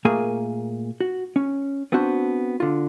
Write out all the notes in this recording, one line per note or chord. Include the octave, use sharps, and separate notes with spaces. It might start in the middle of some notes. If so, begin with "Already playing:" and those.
A#2 A3 A#3 G#4 A#4 G#5
F#4
C#4
B3 C4 D4 F#4 C5
D3 F4